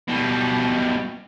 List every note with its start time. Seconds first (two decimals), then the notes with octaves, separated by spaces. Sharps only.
0.08 B2 G3